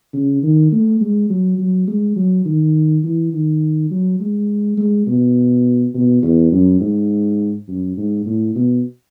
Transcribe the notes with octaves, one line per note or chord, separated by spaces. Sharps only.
C#3
D#3
A3
G#3
F#3
F#3
G#3
F#3
D#3
E3
D#3
F#3
G#3
G#3
B2
B2
E2
F#2
G#2
F#2
G#2
A2
B2